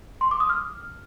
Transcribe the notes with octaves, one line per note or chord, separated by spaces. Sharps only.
C6
D6
D#6
F6